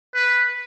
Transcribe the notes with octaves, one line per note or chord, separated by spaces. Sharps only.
B4